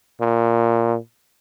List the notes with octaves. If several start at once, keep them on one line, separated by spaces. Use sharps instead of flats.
A#2